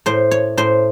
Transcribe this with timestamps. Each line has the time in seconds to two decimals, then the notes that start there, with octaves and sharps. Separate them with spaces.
0.06 A2 C5
0.31 C#5
0.57 A2 C5